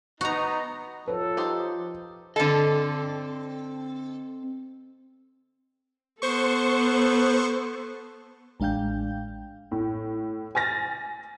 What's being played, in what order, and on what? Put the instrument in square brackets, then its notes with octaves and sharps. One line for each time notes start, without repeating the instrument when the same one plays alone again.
[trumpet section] B3 D#4 [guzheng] F#4 A#5
[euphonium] F3 [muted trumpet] A4 [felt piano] B4 C#5
[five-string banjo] D#4 G4 C5
[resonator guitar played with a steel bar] D3 A4 [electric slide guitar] C4 D#5
[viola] B3 A4 [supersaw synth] C5 C#6
[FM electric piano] A1 G#3 D4 F5 G5 G6
[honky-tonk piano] A2
G#5 F6 A6 A#6